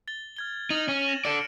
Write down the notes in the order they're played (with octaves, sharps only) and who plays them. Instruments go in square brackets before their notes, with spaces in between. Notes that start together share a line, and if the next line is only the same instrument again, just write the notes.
[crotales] A6 G7
F6 G#6 G7
[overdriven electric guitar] D#4 [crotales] F6 D#7 F#7
[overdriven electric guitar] C#4 [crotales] G#6
[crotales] A#6 E7 F#7
[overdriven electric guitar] A4 D5 [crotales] C#7 D7